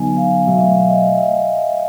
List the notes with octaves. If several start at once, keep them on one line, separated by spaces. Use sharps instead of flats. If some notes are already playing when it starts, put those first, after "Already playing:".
Already playing: D3 F#3 B3 D#4 G#5
F5
B2 F#3 A3 E5
E5
D#5